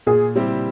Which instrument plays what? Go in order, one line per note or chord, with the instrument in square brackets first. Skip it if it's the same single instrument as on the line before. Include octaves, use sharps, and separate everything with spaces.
[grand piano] A#2 [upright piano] G#4
[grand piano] G3 C4 E4 G4